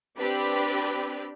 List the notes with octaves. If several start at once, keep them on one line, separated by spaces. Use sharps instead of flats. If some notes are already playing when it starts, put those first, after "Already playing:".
C4 D4 G4 B4